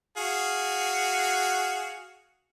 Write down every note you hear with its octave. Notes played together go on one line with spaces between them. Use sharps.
F#4 G#4 F5